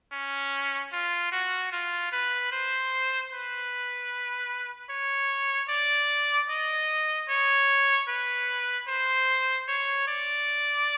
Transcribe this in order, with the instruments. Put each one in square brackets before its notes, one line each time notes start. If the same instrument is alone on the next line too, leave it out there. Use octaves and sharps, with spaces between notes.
[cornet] C#4
F4
F#4
F4
B4
C5
B4
C#5
D5
D#5
C#5
B4
C5
C#5
D5